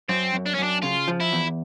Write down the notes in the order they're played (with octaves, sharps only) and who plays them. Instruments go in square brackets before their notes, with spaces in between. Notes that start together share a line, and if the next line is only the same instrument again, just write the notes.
[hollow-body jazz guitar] F#2 [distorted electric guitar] C4
[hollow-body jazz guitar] F#2
[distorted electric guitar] D4
C#4
[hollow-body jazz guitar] F#2 [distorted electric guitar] D4
[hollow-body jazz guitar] C#3 [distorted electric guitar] F4
[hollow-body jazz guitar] F3
[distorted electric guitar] E4
[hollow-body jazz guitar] E2